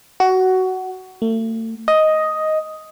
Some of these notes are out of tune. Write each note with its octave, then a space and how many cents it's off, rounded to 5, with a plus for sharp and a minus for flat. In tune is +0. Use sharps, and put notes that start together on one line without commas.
F#4 +15
A3 +35
D#5 +5